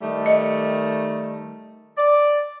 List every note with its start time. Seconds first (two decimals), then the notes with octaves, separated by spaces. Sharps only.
0.01 D#3 G3 A3
0.26 D#5
1.97 D5